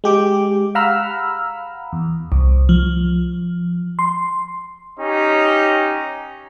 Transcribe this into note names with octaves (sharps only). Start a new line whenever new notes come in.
G#3 G4 D6
F5 F#5 A#5 B5 E6 F6
E2
C2
F3
C6
C#4 D#4 G4